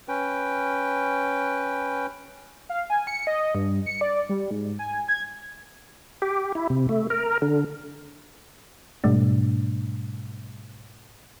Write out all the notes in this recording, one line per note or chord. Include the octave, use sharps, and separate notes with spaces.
C#4 B4 G5
F5
G#5
C#7
D#5
G2
C#7
D5
G3
G#2
G#5
G#6
G4
E4
C3
A3
A#4
D3
G#2 B2 G3 A3 D4